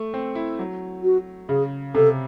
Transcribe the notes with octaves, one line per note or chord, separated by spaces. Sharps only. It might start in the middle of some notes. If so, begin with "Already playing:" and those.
Already playing: A3
C4
E4
F#3
F#4
C#3 G#4
C3 A4